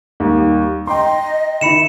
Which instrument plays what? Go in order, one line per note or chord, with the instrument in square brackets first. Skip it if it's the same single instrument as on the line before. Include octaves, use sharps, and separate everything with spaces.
[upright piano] D#2 G3
[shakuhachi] D#5 [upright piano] G5 A#5 C6
[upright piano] D#3 E4 [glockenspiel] B5 C#7 E7